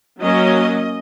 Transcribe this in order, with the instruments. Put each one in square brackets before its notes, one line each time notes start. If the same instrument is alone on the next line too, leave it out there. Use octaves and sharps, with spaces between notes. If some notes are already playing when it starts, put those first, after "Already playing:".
[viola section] F#3 A#3 C#4 D#5